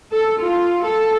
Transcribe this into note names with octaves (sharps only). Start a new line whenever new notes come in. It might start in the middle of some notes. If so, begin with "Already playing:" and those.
A4
F4
A4